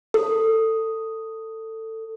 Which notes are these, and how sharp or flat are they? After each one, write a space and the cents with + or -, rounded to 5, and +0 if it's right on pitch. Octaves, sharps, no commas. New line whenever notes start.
A4 +20